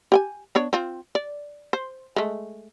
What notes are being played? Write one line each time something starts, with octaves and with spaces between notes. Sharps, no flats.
G4 G5 G#5
B3 D4 C#5
C4 F4
D5
C5
G#3 A3